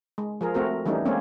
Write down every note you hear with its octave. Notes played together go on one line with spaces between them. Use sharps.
G#3
F3 G#4 A#4
A3 C4 F#4 A#4
E3 G3 A3 C#4 D#4
G#3 A#3 C4 C#4